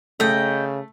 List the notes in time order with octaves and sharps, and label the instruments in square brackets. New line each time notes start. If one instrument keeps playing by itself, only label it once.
[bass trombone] C#3 [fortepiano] A3 [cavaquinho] D#5 G5